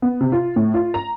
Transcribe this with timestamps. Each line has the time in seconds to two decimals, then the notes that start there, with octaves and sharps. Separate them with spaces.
0.02 B3
0.21 C3
0.32 F4
0.56 A2
0.74 F4
0.94 A#5